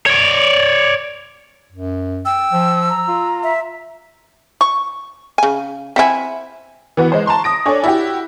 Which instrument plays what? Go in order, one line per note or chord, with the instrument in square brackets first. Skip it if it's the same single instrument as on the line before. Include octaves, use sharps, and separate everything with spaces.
[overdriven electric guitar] C#5 D5
[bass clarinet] F#2
[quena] G5 [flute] E6
[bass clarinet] F3
[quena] A#5
[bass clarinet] F4
[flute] E5
[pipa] C#6
[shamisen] C#3 G#5
[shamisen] C4 E4 [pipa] E5 F#5 G#5
[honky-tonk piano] E3 B3 F#4
G#3 C5
A5 A#5 C6 C#6
D#6 A#6 D7
D4 A4 C#5 D5 G#5
E4 F#4 G4